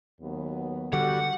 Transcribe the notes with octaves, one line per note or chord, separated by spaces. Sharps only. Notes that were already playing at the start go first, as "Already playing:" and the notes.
D#2 F#3 B3
D3 G3 F#4 F#5